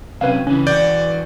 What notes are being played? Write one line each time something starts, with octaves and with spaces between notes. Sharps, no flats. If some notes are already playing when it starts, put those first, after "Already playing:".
C3 F#3 C#4 B4 F5
C#3 E3 C#4
E2 E3 F#4 D5 G6